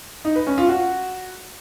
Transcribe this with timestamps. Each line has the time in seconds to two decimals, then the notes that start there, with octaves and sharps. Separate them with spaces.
0.25 D#4
0.36 B4
0.47 C#4
0.58 F4
0.69 F#4